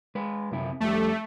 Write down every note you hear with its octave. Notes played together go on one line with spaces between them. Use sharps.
G#3 B4
F#2 C3 E4
F2 G3 A3